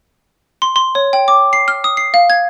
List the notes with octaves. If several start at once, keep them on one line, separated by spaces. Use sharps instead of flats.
C6
C6
C#5
G5
D6
C7
F6
D#6
C7
F5
G#6